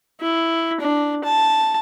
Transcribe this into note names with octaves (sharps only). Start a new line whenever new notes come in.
E4
D4
A5